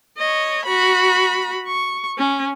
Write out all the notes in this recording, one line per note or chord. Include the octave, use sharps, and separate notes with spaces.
C#5 D#5
F#4 B5
C#6
C#4